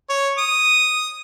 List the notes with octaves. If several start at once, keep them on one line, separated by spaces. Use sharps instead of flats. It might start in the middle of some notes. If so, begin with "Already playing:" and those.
C#5
D#6